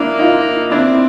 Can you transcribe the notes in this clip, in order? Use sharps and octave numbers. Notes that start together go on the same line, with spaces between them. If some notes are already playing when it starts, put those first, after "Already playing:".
Already playing: A#3 D4 E4
D#4 F4
C4 D4 E4